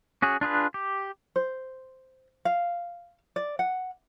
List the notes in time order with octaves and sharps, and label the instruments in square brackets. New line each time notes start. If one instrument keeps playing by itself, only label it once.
[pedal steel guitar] C#4 F#4 G#4
D4 F4 G#4 B4
G4
[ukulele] C5
F5
D5
F#5